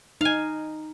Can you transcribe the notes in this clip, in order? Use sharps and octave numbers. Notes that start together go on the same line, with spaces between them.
D#4 F5 G#5